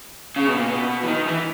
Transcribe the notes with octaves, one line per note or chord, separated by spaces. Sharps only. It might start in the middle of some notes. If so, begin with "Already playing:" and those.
C#3
B2
A#2
B2
E3
D#3
E3